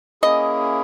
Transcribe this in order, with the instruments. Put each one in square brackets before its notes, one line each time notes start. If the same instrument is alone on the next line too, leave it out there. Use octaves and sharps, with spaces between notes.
[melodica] A#3 C#4 E4 G#4 [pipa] D#5